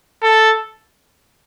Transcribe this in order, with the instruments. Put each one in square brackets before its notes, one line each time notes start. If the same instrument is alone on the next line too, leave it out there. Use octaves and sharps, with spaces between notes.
[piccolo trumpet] A4